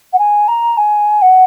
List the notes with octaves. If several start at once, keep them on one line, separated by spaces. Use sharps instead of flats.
F#5
G#5
A#5
G#5
F#5